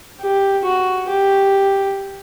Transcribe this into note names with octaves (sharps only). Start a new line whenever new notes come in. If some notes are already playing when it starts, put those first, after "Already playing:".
G4
F#4
G4